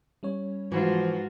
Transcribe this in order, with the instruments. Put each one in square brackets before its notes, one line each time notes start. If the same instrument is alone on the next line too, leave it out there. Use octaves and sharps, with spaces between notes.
[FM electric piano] G3 C#4 C#5
[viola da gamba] G#2 F4 F#4 [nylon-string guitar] E3 [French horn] F3